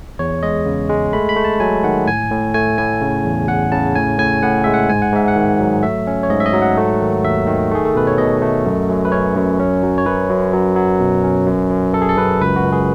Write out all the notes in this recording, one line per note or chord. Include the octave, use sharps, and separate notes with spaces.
E2 C#5
G#3 D#5
C#3
G#3
A3 B5
B5
A3
A5
F#3 G#5
D#3 F#5
A2 G#5
A2
A3 G#5
A2 G#5
C#3
E2
E2 F#5
C#3 A5
A2 G#5
A2 G#5
A2 F#5
G#3 E5
F#5
G#2 G#5
F#5
G#2 E5
F#5
D#3
F#3
A3 E5
C#4
C#5
G#2 D#5
E5
D#5
F#3
F#5
A3
D#3
D#2 E5
D#3
A3 G#4
A4
B2 B4
C#5
B2 D#5
A3
F#2
F#2
B4
C#4 C#5
F#2
C#4
F#3
C#5
F#2 B4
F#2
F#3
F#3
B2
C#4
F#2
F#2
F#2 A4
G#4
A4
F#2 B4
C#2 B4
F#4
C#2
G#4